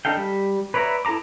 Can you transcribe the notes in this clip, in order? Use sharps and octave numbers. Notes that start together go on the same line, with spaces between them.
D4 D#4 A4 F5 G5
G3
B4 C#5 D5 E5 A#5
E4 A4 A5 A#5 D6